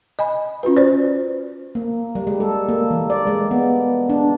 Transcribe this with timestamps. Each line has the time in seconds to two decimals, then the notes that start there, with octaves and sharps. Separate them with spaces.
0.19 D#5 G#5 B5
0.63 C#4 F4 F#4 B4
0.77 C5 D5
1.75 A#3
2.15 G3
2.27 G#3
2.40 A4
2.69 A#3
2.91 E3
3.10 D5
3.27 G#3
3.51 B3
4.10 D4